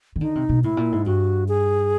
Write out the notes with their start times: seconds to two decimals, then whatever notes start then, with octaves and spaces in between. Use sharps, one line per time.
0.16 D#3
0.21 D3 D#4
0.35 C3
0.49 B2
0.64 A2 E4
0.77 A#2
0.92 G#2
1.06 G2 F#4
1.48 G#4